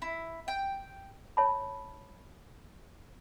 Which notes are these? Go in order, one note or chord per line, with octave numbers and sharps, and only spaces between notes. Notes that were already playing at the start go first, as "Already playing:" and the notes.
E4
G5
C#5 E5 A5 B5